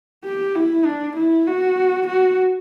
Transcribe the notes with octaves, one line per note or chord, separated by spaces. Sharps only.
G4
E4
D4
E4
F#4
F#4